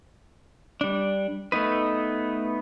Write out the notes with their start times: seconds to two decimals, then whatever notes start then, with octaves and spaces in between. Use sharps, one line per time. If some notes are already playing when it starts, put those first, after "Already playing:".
0.81 G3 D4
1.52 A3 B3 D#4 B4